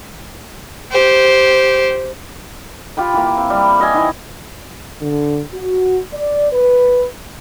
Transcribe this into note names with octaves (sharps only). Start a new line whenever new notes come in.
G4 C5
F4 G4 G5 B5
E3 A#3
C4
G3
B4 D#5 E5 G#5
D#3 E3
D3
F#4
D5
B4